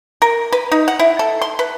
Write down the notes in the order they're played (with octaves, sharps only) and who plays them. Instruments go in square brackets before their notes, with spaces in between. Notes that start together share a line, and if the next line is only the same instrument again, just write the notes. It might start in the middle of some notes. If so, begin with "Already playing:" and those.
[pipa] A#4
B4
D#4
F#5
E4
A4
C6
B4